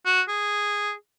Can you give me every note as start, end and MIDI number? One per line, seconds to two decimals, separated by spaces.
0.06 0.21 66
0.28 0.92 68